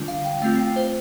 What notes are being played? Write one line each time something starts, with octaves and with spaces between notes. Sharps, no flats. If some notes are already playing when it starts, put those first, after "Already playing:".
Already playing: D3 G3 D4 F4
F5
G5
A3 C4 F4 F5
G5
C5